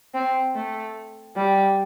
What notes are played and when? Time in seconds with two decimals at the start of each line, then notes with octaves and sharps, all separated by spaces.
0.14 C4
0.55 A3
1.36 G3